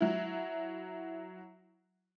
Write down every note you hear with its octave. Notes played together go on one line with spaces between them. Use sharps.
F#3 E4